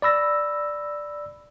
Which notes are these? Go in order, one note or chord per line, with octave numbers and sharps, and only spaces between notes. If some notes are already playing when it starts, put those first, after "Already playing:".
D5 B5 E6 A#6